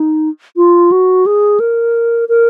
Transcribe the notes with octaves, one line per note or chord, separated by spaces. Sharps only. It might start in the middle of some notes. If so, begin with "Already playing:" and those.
Already playing: D#4
F4
F#4
G#4
A#4
A#4